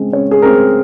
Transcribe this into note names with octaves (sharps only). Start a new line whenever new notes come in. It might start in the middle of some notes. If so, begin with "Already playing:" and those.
Already playing: C#3 G#3 C4
C#3 C#5
G#4
G#3 C4 A#4